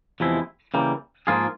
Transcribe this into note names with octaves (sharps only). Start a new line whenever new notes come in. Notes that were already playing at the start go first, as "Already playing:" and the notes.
E2 C3 F3 G#3 E4
C#3 E3 G3 A#3
G#2 F3 A#3 F4 G#4